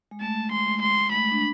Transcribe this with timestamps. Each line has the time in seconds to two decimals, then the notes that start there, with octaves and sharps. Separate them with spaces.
0.11 G#3
0.21 A3 A5
0.51 G#3 C6
0.82 C6
1.12 A3 B5
1.31 D4